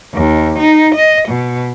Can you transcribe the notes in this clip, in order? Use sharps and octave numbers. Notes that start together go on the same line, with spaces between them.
D#2
D#4
D#5
B2